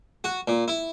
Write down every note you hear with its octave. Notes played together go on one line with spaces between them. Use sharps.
F#4
A#2
E4